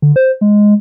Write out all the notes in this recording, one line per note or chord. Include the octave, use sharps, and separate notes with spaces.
D3
C5
G#3